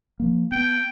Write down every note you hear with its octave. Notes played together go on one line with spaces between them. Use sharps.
F3 A#3
B3 G5